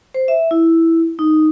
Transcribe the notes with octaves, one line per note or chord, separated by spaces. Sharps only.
C5
E5
E4
D#4